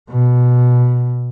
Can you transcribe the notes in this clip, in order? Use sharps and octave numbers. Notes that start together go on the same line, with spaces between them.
B2